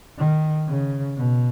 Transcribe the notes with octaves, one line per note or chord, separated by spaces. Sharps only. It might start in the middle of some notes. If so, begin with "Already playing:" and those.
D#3
C#3
B2